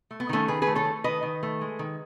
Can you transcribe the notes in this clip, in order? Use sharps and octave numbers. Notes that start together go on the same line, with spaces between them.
A3
B3
D#3 A3 C#4
D#3 G#4 B4
G#4 B4
A3
A4 C#5
A3
D#3 B4 D#5
D#3
A3
G#3
D#3